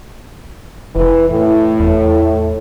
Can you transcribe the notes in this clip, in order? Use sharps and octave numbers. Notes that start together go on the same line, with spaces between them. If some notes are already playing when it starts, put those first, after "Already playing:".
F1 E3
A2
E2